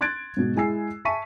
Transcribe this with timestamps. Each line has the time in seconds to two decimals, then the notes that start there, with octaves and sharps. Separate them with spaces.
0.01 C6 F#6 G#6 A6 D7
0.37 G#2 B2 F#4
0.56 G#3 E4 G#5 E6 C7
1.05 E5 G#5 A5 C#6 B6 D#7